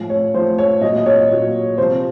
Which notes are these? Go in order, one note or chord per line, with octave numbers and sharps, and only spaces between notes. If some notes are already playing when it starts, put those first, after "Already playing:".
Already playing: A2 F3
C#5
A2 F3 C5
C#5
A#2 F#3 D#5
D#5
C#5
A#2 F#3
C3 F3 C5